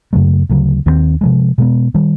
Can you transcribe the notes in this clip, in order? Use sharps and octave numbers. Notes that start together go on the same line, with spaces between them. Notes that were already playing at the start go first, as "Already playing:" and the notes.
F#2 C#3 F#3 A3
D2 C#3 F#3
D#2 D#3 G#3 C4
C3 F3 G#3
B2 G#3 B3
D#3 G3